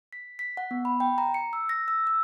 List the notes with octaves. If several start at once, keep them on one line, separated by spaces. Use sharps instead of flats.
B6
B6
F#5
B3
B5
G5
A#5
C#7
E6
A#6
E6
E6